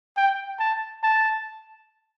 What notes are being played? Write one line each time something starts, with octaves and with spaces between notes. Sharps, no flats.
G5
A5
A5